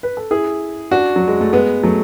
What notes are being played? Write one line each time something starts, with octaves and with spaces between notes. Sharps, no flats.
B4
A4
E4 G#4
D4 F#4
F#3
G#3
A3
G#3 B3
F#3 A3